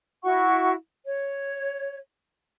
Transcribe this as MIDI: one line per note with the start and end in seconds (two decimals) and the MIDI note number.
0.23 0.73 64
0.23 0.73 66
0.23 0.73 78
0.23 0.73 85
1.05 1.98 73